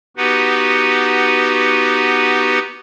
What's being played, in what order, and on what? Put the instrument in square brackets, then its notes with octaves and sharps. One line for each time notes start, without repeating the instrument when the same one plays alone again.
[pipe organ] B3 D#4 F#4 G4 B4 F#5